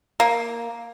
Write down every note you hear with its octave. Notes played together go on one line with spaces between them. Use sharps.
A#3